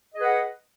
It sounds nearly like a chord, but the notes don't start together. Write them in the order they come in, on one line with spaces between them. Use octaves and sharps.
D#5 G#4 B4 F#5